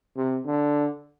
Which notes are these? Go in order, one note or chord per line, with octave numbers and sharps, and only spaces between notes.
C3
D3